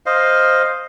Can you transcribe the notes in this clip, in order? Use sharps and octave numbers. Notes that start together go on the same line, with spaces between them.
C5 D#5 F5